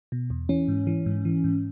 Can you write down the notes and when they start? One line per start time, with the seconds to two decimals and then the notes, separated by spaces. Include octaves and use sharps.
0.12 B2
0.30 E2
0.49 E3 C#4
0.68 G#2
0.87 E3
1.06 G#2
1.25 E3
1.44 G#2